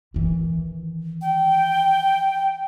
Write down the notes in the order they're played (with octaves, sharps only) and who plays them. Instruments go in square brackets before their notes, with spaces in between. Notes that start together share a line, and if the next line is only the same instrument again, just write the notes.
[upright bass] D#3 E3
[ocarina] G5